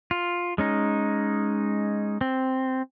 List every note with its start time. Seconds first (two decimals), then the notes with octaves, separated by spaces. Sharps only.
0.11 F4
0.58 G#3 C#4 D#4
2.21 C4